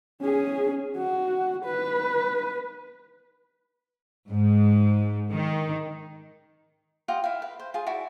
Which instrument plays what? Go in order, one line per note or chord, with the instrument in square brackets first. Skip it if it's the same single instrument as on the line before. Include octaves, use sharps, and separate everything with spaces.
[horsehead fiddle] C#4 G#4
F#4
B4
[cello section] G#2
D#3
[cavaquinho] F4 G4 D#5 F#5
E4 F5
B4
C5
F4 G#4
E4 F#4 D5